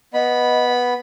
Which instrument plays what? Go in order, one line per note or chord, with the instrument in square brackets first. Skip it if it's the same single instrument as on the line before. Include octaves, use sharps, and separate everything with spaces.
[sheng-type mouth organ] B3 B5 [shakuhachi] D#5